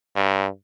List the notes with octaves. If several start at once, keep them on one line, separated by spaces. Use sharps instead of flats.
G2